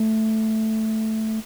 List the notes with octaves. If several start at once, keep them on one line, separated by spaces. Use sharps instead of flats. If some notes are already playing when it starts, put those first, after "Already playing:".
Already playing: A3